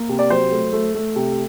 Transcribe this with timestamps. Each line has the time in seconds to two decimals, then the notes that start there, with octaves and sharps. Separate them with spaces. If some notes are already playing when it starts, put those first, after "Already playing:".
Already playing: A#3
0.09 C3
0.19 D5
0.30 F#3 C5
0.51 A3
0.73 A3
0.94 A3
1.16 C3